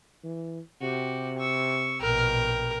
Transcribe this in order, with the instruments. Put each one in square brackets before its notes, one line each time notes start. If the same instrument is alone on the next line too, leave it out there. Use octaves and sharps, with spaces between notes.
[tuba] E3
[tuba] C3 [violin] F#4 G4
[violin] C#6 E6
[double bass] A#1 B2 [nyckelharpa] A#4 [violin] G5